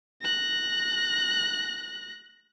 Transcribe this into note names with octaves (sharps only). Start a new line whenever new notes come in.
F#6 A#6